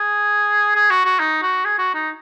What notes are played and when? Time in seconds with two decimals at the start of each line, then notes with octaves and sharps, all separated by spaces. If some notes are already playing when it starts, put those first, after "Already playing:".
Already playing: G#4
0.75 G#4
0.90 F#4
1.05 F#4
1.19 D#4
1.42 F#4
1.65 G#4
1.79 F#4
1.94 D#4